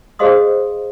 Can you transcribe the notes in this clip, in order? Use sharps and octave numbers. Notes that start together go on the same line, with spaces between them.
G#4 C5 D#5 F5 C6 D#6